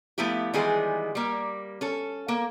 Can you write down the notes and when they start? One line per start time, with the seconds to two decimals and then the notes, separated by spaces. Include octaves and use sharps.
0.18 F3 A3 B3 E4 G4
0.54 D#3 E3 G3 G#3 B3 G#4
1.15 G3 A#3
1.81 C#4 A4
2.28 A#3